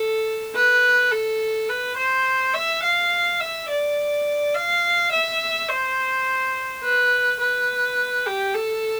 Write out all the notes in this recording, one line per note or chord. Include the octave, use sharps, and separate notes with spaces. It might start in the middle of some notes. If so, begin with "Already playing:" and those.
Already playing: A4
B4
A4
B4
C5
E5
F5
E5
D5
F5
E5
C5
B4
B4
G4
A4